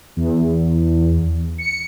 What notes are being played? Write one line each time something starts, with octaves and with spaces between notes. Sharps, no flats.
E2
C#7